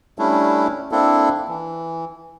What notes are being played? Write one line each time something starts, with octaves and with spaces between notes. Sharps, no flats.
G3 A3 C#4 D4 E4
A#3 C4 D4 E4 A4
E3